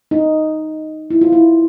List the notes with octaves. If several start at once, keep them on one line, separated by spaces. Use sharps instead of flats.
D#4
E4
F4
E4